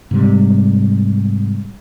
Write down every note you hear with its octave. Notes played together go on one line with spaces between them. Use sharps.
G#2 C3 G3